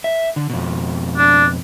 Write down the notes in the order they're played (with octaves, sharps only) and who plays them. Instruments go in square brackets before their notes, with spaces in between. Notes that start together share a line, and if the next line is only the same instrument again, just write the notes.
[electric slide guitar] E5
D3
F2 B2
[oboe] D4